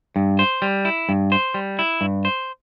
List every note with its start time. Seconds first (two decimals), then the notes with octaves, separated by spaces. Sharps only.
0.16 G2
0.39 C5
0.62 G3
0.85 E4
1.09 G2
1.32 C5
1.54 G3
1.79 E4
2.01 G2
2.25 C5